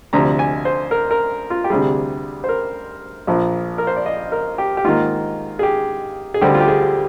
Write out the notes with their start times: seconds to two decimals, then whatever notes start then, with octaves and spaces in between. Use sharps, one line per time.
0.13 D2 C3 F3 A#5
0.39 G#5
0.65 C5
0.91 A#4
1.11 A#4
1.50 F4
1.64 G4
1.70 D2 C3 G3 G#4
2.44 C5
2.49 A#4
3.27 A#1 A#2 F3
3.78 A#4
3.87 C5
3.96 D5
4.06 D#5
4.32 A#4
4.58 G4
4.77 G4
4.84 G#2 D#3 A#3 F4
5.59 G#4
5.63 G4
6.34 G#4
6.41 D2 D3 G3 C4 G4
6.54 F4
6.60 G4
6.68 G#4